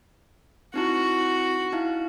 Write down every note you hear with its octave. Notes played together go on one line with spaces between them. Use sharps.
C4 D#4 E4 F#4
D#4 E4 F5